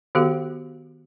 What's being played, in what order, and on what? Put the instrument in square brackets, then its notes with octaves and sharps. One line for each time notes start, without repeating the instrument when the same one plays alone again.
[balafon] D#3 B3 F#4 G4 A4 F5